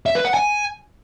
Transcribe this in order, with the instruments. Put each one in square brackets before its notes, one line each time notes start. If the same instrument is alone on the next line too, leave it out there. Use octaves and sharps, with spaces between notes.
[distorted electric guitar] E5
B4
F#5
G#5